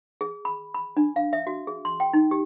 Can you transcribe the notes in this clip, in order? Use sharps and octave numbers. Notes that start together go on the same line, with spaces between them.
G#4
B5
B5
D4
F5
E5
F#4
G#4
C6
G5
D#4
G4